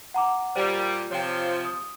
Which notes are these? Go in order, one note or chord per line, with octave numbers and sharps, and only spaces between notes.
F#5 A#5 D6
A#2 G3 C5
C3 F3 C#5 G5
D#6